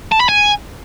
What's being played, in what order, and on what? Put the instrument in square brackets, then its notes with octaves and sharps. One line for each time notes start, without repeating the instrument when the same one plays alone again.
[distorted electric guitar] A5
B5
G#5